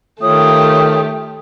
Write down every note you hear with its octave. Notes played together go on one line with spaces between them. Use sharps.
D#3 A3 F4 G4 C#5 D#6